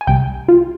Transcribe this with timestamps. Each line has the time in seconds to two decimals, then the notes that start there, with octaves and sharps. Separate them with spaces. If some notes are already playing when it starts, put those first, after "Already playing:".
0.01 G#5
0.07 C2 C3 G3 G5
0.48 F4